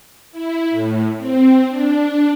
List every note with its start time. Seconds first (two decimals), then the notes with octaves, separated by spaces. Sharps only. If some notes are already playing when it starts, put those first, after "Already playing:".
0.32 E4
0.70 A2
1.18 C4
1.69 D4